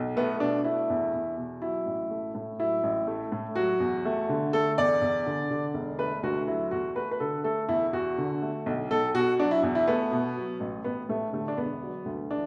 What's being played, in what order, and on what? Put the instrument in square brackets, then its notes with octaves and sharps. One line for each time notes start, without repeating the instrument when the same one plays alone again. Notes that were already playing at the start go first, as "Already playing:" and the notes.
Already playing: [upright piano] B1
A3 B3
B2 D4
A3 E4
E2
E2
B2
F#3 E4
A1
A3
A2
F#3 E4
A1
A3
A2
F#3 F#4
E2
A3
D3
A3 A4
E2 D5
E2
D3
D3
E1
A3 B4
D2 F#4
F#3 E4
E2 F#4
A3 B4
B4
D3 A4
A3 A4
E2 E4
E2 F#4
D3
A3
B1
B1 A4
B2 F#4
F#3 D4
E4
E2
E4
A3 B3
B2
F#3
A1
A1 B3
A2 A3
D3 A3
D4
E1 B3
F#3
D2
E3 D4